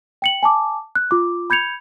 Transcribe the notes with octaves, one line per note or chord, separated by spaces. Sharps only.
G5 C#7 F#7
G#5 A5 D6
F#6
F4 D6
B5 G6 G#6 C#7 F7